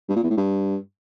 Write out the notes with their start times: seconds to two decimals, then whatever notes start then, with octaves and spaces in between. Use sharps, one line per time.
0.09 G2
0.16 A#2
0.23 E2
0.30 A2
0.37 G2